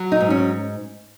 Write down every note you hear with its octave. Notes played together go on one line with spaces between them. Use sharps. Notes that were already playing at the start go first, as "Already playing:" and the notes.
Already playing: F#3
D#4
G#2
C#4